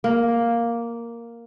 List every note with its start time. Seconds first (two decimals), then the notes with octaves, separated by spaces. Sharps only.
0.04 A#3